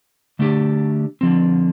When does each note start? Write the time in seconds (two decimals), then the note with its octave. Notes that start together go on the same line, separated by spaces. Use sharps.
0.39 D3 A3 D4 G4
1.21 D3 F3 C4